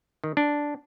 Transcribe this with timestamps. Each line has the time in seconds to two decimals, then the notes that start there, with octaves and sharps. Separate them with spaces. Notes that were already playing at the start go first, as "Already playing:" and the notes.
0.24 D#3
0.37 D4